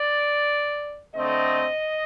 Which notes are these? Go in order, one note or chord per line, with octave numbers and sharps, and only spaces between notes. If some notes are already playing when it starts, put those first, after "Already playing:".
Already playing: D5
D3 A3 C4 D#5